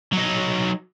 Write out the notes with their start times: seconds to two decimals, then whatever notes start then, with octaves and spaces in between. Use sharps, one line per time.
0.13 F#3 D#4